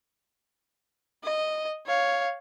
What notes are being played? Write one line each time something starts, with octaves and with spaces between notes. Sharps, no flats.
D#5
C#5 F5